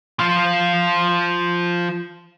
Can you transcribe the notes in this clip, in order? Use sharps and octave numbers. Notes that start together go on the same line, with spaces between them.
F3 F4